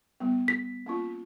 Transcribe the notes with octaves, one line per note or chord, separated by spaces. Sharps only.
G3 B3
B6
A#3 C#4 F4